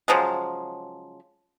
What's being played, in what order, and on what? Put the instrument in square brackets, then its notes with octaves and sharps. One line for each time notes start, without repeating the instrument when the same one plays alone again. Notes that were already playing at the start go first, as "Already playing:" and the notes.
[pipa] C#3 F3 F#3 G#3